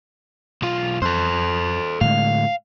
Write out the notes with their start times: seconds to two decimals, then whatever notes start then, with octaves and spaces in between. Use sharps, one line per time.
0.62 B1 F4
1.02 F2 A4 C5
2.01 A2 D3 G#3 F5